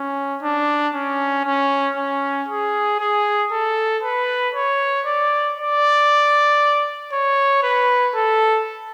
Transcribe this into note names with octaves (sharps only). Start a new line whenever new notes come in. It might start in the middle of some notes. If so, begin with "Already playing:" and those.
Already playing: C#4
D4
C#4
C#4
C#4
G#4
G#4
A4
B4
C#5
D5
D5
C#5
B4
A4